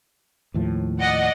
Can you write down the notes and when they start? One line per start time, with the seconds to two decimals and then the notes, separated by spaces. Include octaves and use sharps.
0.54 D#2 A2 F3
0.99 D5 D#5 F#5